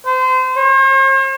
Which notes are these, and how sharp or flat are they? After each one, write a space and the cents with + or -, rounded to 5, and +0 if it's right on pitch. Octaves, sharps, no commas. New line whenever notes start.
C5 -30
C5 +45